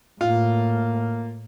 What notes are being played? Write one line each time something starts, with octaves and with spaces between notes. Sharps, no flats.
A2 A#3 F4